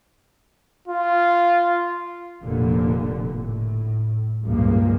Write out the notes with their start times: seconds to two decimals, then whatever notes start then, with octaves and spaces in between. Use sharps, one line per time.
0.88 F4
2.44 F1 A#2 D3
3.30 A2
4.46 C#2 G2 A#2 F3 A#3